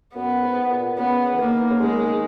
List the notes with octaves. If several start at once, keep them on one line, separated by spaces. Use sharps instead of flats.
F#2 B3
G#2
A#2
C#3 B3
E3
D#3 A#3
C#3
D#3 G#3